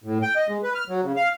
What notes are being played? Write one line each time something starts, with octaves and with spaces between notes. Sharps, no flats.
A2
G5
D#5
G#3
B4
F6
F#3
C#3
F5